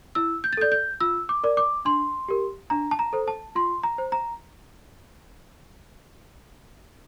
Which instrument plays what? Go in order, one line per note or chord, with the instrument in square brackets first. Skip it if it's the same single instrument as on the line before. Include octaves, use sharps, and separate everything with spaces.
[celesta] E4 E6
G6
A6
A4 D5 G6
G6
F4 E6
D6
A#4 D5
D6
D4 C6
G4 A#4
D4 A#5
A5
A#5
A4 C5
A5
F4 C6
A#5
C5
A#5